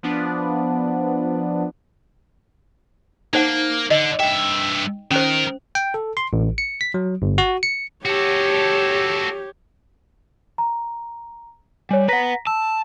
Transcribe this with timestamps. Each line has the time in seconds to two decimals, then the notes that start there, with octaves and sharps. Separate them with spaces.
0.03 F3 B3 D4
3.33 A#3 D#4 C5 F#5
3.91 D3 D#5
4.20 G2 E5 G5
5.11 D#3 C#4 A#4 C5
5.75 G5
5.94 A4
6.17 C6
6.33 A1
6.58 C#7
6.81 B6
6.94 F#3
7.22 G1
7.38 F#4
7.63 C#7
8.05 F#4 G4 A4 C#5
10.58 A#5
11.91 G3 C#5 G#5
12.08 B4 F#5 A#5 A#6 B6
12.47 A5 E6